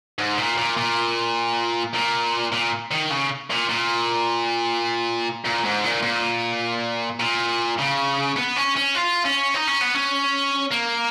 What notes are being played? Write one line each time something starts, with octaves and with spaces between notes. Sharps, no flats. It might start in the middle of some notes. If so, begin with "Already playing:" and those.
G#2
A#2
A#2
A#2
A#2
A#2
D#3
C#3
A#2
A#2
A#2
G#2
A#2
A#2
A#2
C#3
B3
C#4
C#4
F4
C#4
D#4
C#4
B3
C#4
A#3